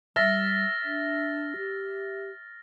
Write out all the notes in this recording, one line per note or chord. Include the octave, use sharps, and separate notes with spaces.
G3 E5 F6 A6 A#6
D4
G4